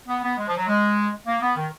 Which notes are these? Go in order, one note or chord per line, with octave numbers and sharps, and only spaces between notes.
B3
B3
G#3
F3
F#3
G#3
A#3
B3
D#3